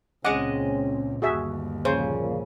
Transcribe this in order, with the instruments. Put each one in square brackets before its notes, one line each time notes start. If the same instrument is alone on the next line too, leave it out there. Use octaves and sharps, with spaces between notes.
[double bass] C#2 A#2 [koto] G#3 D#5 [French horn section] C4 C#4 [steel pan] F#5 D6
[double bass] G1 D#2 [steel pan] F#4 G#4 E5
[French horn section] A#2 F3 [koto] C#3 [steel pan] C5